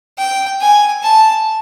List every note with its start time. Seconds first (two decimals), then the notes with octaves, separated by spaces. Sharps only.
0.18 G5
0.61 G#5
1.03 A5